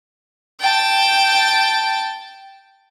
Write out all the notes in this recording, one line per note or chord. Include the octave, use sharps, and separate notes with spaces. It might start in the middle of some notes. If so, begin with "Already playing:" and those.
G5 A5